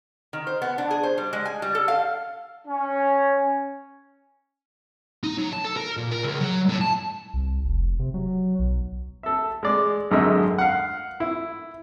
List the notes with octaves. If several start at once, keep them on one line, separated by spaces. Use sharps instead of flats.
D#3
C5
B3
D4
G#4
C5
G3
G#3
G#5
G3
A4
F5
C#4
D#4
F#3
A5
A4
A#4
A#2
A#4
C#2
F#3
A2
A5
C2
F1
C3
F#3
B1
A4 E5
G#3 D5
G#1 F#2 D3 G#3 D#5 E5
F5 F#5
E4